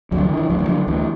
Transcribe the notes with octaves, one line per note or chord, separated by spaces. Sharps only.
D2 F#3
D3
E3
D3
E3
D2 F#3
E3
D3 F#3
D2 E3